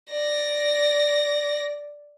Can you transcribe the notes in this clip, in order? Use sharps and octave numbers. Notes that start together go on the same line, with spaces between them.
D5 A#6